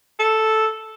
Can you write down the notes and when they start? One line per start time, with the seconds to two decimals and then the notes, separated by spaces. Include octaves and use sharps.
0.20 A4